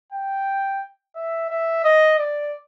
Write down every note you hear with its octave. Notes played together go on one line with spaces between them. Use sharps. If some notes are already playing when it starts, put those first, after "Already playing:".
G5
E5
E5
D#5
D5